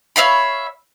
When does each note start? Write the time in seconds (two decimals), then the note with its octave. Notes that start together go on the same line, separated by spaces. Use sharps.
0.16 C#5 E5 F5 B5